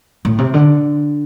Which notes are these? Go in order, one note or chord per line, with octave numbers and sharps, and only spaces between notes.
A2
C3
D3